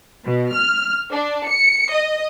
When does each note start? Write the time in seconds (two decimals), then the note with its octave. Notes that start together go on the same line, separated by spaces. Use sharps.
0.24 B2
0.53 F6
1.12 D4
1.48 C#7
1.92 D#5